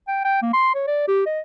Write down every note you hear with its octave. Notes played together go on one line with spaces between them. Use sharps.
G5
G5
A#3
C6
C#5
D5
G4
D#5